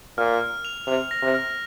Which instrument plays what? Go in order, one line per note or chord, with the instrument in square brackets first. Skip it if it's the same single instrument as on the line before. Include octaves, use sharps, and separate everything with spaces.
[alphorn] A#2 [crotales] F6
[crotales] F6
F7
[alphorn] C3 [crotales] F7
[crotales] A#6
[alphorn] C3
[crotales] F6